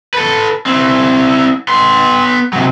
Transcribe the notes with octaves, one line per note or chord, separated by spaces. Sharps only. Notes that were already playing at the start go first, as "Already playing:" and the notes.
A4 B4
C4 E4
B3 C6
C3 F#3